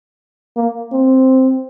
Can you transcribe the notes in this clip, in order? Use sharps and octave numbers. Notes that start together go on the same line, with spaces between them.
A#3
C4